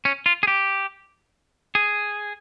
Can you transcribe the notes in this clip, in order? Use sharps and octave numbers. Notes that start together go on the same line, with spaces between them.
C#4
F4
G#4
G4
G#4